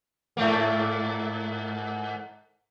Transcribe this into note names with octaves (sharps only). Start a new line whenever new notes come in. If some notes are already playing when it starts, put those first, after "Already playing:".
G#2 A3 A#3